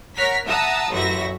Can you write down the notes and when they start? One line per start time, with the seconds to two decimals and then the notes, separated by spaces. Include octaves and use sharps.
0.16 A#4 C#5 F#5 A#5 F6 B6
0.45 E5 F#5 A5 A#5 D#6 E6
0.90 A1 F#2 F#4 E5 A#6